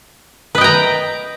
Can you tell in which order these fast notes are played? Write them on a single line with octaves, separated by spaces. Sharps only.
B4 D#5 G5 A#5